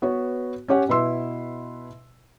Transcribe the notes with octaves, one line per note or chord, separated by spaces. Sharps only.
B3 F#4 B4 C#5
C#4 G4 C#5 F#5
B2 E4 B4 E5 C6 E6